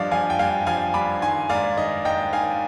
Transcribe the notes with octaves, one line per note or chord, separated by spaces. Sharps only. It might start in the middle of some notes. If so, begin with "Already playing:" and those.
Already playing: G2 F3 D5 D#5 F5
F3 F5 G#5
G5
G2 F5 G#5
F3 F5 G#5
G2 B5 D6
D#3 G#5 C6
G#2 D5 F5
D#3 D#5
G#2 D#5 G5
D#3 F5 G#5